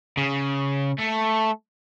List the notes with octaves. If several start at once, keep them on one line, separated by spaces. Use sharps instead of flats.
C#3
A3